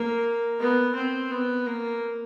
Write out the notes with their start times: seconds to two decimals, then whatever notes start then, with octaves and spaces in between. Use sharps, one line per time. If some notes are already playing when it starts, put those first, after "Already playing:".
Already playing: A#3
0.60 B3
0.95 C4
1.31 B3
1.66 A#3